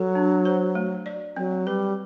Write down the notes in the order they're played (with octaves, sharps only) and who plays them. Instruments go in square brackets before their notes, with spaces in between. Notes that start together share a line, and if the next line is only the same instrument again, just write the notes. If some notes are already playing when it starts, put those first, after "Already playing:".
Already playing: [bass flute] F#3 [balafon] A4
[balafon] D4
C5
A3
D5
[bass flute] F#3 [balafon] C4
[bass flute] G3 [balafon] B4